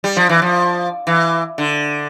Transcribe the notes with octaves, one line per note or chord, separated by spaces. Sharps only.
G3
F3
E3
F3
E3
D3